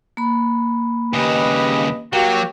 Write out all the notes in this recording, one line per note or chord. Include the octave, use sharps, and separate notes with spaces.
A#3 B5
D#2 C#3 G4 B4 D#5
F#3 A#3 F#4 G4 G5